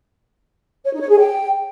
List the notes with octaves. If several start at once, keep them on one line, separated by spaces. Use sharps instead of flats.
C#5
D#4
C#5
G#4
G5